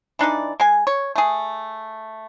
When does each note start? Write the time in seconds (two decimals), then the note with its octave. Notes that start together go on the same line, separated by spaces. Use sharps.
0.19 E3 D4 D#4 D5
0.60 G#3 G#5
0.87 C#5
1.16 A3 G#4